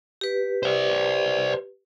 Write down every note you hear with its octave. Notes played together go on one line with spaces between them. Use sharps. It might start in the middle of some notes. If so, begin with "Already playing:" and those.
G4 B4
C5 D5